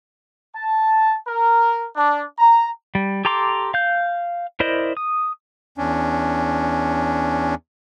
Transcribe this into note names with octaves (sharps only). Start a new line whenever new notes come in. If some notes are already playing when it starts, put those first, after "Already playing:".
A5
A#4
D4
A#5
G3
G4 A4 A#5 C6 D6
F5 G6
E4 A#4 C5 D5 D#5
D#6
E2 C#4 D4